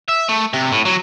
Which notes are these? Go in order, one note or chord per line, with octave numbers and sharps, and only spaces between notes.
E5
A3
C3
A2
F#3